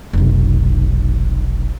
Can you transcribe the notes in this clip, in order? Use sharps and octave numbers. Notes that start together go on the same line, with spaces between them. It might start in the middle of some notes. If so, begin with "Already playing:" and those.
F1 B1